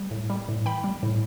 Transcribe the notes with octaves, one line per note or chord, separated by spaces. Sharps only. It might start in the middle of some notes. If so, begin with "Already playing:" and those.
Already playing: G3
A2
G3
A2
E3 G5 B5
G3
A2